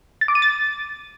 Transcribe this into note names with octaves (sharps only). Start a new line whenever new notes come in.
A6
D6
D#7
A6